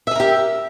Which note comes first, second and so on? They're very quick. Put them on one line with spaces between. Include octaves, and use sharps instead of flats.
E5 G#4 A#4 G4